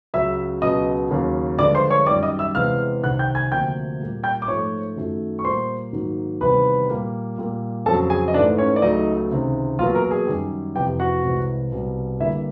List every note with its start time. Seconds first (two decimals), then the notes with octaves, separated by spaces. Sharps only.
0.14 C#2 C#3 F#3 E5 E6
0.62 C#2 B2 F#3 D#5 D#6
1.10 D#2 C#3 F#3 A#3
1.58 G2 D3 F3 G#3 D5 D6
1.75 C5 C6
1.90 C#5 C#6
2.06 F#2 D#3 G3 D5 D6
2.23 D#5 D#6
2.39 E5 E6
2.55 E2 C3 E3 G#3 F5 F6
3.03 C2 C3 D#3 F#5 F#6
3.19 G5 G6
3.35 G#5 G#6
3.51 D2 C3 F3 A#3 G5 G6
4.00 A#2 G3 A#3
4.23 G5 G6
4.42 D6
4.48 G#2 F3 A3 C#5 C#6
4.96 F#2 D#3 F#3 A3
5.39 C#6
5.45 A#2 G3 A#3 C5 C6
5.93 G#2 D#3 F#3 A#3
6.41 E2 C3 D#3 G3 B4 B5
6.89 A#2 G3 A#3
7.38 A#2 G3 A#3
7.86 F2 C#3 F#3 A4 A5
8.10 G#4 G#5
8.28 D#5
8.34 G#2 E3 A3 D4 D5
8.58 C#4 C#5
8.76 D5
8.82 C#2 C#3 F#3 A3 D#4 D#5
9.31 C#2 C3 D#3
9.79 E2 B2 F#3 A#3 F4 F5
9.95 A#4 A#5
10.11 G#4 G#5
10.27 F#2 D#3 G3
10.75 F2 C3 E3 G4 G5
11.00 F#4 F#5
11.24 C2 C3 E3 G#3
11.72 C2 B2 G3
12.20 G2 D3 G3 A#3 E4 E5